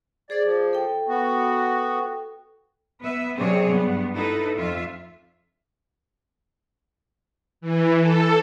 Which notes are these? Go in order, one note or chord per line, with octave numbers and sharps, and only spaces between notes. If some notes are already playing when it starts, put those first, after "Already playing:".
G#4 C5 D5 D6
F3
A4 G5
B3 F#4
B3 B4 E5
C3 F#3 C4 G#4 C#5 D5
G2 B3
D#4 E4 A4 B4
F2 F4 E5
E3
A4